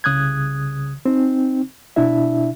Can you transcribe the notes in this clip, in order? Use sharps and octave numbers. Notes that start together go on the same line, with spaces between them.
C2 C#3 D#6 F#6 G#6
C4 D#4
B2 D4 E4 E5